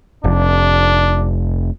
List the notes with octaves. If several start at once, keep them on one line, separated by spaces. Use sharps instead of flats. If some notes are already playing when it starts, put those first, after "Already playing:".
F1 D4